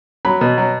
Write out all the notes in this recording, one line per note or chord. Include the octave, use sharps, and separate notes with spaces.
F#3 B5
B2
F#3